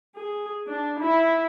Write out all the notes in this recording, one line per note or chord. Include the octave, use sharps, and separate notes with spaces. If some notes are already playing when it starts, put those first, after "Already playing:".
G#4
D4
E4